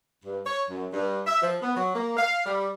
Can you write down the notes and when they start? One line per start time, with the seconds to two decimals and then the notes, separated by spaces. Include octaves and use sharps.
0.25 G2
0.45 C#5
0.70 F#2
0.93 G2
1.27 E5
1.42 F3
1.62 B3
1.76 F#3
1.94 A#3
2.17 F5
2.45 G3